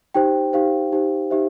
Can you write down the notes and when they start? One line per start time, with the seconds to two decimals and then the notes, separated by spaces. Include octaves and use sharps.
0.14 D#4 G4 C5 G5
0.53 D#4 G4 C5 F5
0.92 D#4 G4 C5
1.31 D#4 G4 C5 E5